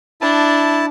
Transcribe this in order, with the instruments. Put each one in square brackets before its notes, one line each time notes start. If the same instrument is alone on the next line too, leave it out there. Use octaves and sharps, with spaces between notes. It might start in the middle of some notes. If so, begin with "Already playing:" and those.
[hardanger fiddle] D4 [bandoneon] E4 A5